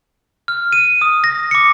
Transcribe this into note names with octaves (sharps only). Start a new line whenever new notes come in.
F6
D#7
D#6
A#6
D6 C#7